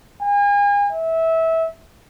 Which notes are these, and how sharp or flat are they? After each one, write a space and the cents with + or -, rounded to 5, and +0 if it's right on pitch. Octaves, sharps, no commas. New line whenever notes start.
G#5 -40
E5 -20